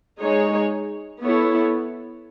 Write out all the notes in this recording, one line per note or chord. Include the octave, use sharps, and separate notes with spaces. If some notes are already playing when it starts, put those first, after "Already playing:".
G#3 D#4 G#4 C#5
B3 E4 A4 C#5